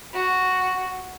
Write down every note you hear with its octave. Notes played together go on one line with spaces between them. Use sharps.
F#4